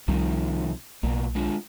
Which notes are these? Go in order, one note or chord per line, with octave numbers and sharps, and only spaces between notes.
C2 C3 D#3 F3 G3
B1 B2 A#3
G#3 D4 F4